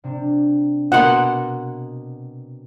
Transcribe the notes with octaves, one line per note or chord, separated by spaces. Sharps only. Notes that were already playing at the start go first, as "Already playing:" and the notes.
C3 D4
B2 A#3 F#5 C6